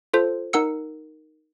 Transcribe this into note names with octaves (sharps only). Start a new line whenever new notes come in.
F4 A4 C5
D#4 A#4 F#5 E6 C#7